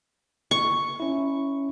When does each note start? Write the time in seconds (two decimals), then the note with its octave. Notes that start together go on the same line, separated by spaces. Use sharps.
0.51 C#6
1.00 C#4 E4